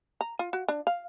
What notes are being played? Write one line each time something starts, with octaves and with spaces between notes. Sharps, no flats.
A#5
F4
F#4
D4
F5